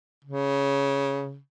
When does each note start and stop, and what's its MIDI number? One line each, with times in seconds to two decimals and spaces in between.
0.25 1.38 49